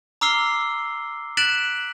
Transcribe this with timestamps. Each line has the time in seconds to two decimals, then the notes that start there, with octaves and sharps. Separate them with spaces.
0.21 A#5 D6 E6 F6 C7 G7
1.37 F#6 A6 B6 D7 E7 F#7